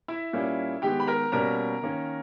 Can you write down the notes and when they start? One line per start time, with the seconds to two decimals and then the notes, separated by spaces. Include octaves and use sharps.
0.08 E4 E5
0.33 A#2 G3 A#3 C#4
0.82 D#3 G#3 B3 G4 G5
1.00 B5
1.07 A#4 A#5
1.32 B2 G3 A#3 C#4 A#4 A#5
1.82 D#3 A#3 C#4